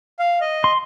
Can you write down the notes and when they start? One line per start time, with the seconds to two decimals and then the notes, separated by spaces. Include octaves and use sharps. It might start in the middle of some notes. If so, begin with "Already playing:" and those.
0.19 F5
0.41 D#5
0.64 C6